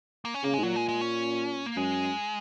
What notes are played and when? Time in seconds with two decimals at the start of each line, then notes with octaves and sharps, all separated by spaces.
0.25 A#3
0.34 C#4
0.43 C#3 A#3
0.54 G#3
0.59 G#2
0.62 A#2 F#3
0.76 G#3
0.89 G#3
1.01 C#4
1.66 A#3
1.77 F#2 G#3